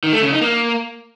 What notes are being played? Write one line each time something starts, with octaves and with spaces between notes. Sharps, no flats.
D#3
A3
C#3
D#4
A#3